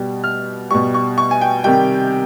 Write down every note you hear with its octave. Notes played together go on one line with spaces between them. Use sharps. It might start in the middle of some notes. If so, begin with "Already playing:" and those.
Already playing: B2 G3
F6
B2 G3 C#6
C#6
C#6
G#5
G5
C3 D#3 G3 G5